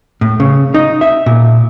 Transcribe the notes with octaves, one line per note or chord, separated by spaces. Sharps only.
A2
C#3
D#4
E5
A#2